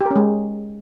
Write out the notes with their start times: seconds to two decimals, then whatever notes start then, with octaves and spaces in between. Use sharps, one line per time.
0.01 G4
0.06 A#4
0.11 C#4
0.16 G#3